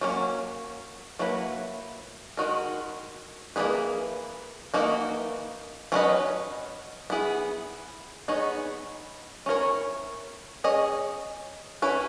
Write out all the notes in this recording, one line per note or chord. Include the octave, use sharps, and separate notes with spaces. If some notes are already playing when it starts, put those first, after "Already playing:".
F#3 A#3 C#4
F#3 A#3 E4 B4
D#3 G#3 D#4 F#4 A#4
E3 A#3 D#4 G#4 B4
E3 A#3 D#4 F#4
F#3 C#4 E4 B4 D#5
B3 E4 G#4
B3 D#4 G#4 C#5
C#4 E4 A#4 C#5
C#4 G#4 D#5
C#4 E4 B4